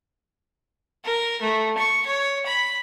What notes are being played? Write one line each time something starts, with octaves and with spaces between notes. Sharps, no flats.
A#4
A3
C#6
C#5
B5